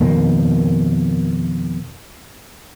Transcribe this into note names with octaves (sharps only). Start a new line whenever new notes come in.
F2 B2 D#3 A#3